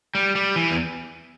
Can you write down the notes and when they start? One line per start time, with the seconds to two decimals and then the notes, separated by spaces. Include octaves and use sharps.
0.15 G3
0.35 G3
0.56 E3
0.71 E2